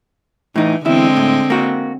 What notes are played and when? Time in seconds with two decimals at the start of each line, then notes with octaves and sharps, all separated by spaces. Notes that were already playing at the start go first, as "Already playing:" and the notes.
0.56 A2 E3 D#4
0.85 E2 D3 G#3 C4 E4
1.17 A2
1.50 A#3 F#4